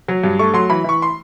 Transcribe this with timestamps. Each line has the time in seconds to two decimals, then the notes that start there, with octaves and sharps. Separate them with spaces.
0.08 F#3
0.23 G2
0.39 A3 C#6
0.53 F#3 C6
0.70 E3 B5
0.84 E3 C#6
1.02 C6